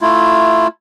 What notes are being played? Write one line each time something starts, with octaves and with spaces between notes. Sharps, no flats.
A3 E4 F4